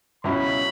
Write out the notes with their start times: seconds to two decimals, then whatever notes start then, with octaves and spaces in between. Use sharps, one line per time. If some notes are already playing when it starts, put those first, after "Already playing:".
0.24 C#2 B2 F#3 C#4 E4 B5